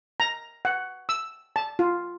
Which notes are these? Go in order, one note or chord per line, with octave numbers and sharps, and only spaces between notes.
A#5
F#5
E6
A5
F4